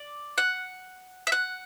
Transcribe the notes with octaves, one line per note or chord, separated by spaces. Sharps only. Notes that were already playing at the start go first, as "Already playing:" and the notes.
Already playing: D5
F#5
E5
F#5